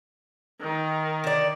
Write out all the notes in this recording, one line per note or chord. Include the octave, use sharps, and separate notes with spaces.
D#3
D3 D5